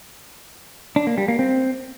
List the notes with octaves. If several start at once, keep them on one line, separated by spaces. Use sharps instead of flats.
D4
A#3
G3
A#3
C4